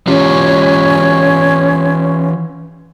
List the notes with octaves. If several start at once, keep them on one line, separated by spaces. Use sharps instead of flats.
E3 C#4 F4 G4